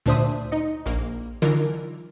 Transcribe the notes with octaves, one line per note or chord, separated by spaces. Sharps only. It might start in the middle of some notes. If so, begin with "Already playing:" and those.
D2 A#2 D4 C5 E5 D#6
D#4 D#5 C#7
A#1 A#3
D3 E3 F#3 D#4 F4 A#4